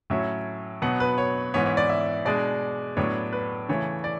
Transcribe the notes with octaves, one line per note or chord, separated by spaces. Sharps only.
A2 F#3 C#4 E5
B2 F#3 B3 F#5
B4
C#5
G#2 E3 B3 C#5
C#5
D5
E5
B2 G#3 D4 D5
A2 F#3 B3 D4 C#5
B4
C#3 E3 A3 C#5
D5